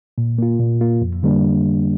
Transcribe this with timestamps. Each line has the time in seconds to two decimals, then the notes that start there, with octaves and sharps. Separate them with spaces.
0.18 A#2
0.38 A#3 F4
0.60 A#2
0.81 A#3 F4
1.01 F2
1.23 D3 G3 A#3 D4